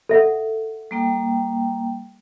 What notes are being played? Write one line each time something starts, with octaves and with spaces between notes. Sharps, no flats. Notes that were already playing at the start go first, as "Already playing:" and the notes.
A4 E5 F#5
G3 A#3 G5